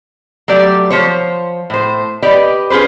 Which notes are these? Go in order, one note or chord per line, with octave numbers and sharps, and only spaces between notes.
F#3 A3 G4 D5
F3 C5 C#5
A2 C5
G4 B4 D5 D#5
C#4 F4 G#4 B4 C5